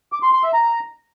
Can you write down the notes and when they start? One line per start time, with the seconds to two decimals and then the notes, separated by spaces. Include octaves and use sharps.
0.12 D6
0.23 C6
0.33 C6
0.43 E5
0.54 A#5